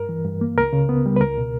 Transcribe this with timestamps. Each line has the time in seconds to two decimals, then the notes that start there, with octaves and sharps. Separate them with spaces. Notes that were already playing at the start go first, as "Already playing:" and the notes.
Already playing: G2 A#4
0.09 E3
0.25 G2
0.41 A#3
0.57 C#2 A#4
0.73 C#3
0.89 B3
1.06 G3
1.16 B4
1.21 C#2 A#4
1.38 B2